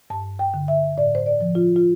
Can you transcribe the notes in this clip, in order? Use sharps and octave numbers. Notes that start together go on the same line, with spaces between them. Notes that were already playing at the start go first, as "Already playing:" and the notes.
G2 A5
G5
D3
E5
A2 D5
C5
D5
F3
F4
F4